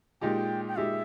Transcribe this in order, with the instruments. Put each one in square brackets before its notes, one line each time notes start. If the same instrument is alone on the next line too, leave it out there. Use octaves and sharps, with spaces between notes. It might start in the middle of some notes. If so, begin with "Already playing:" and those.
[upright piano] A#2 G#3 D#4 G4 [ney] G5
[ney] G5
[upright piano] A#2 G#3 D#4 G4 [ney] E5